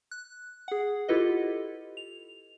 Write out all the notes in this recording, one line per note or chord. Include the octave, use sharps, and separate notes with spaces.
F#6
G#4 F#5
E4 F4 G4 A4 B4 D#5
F7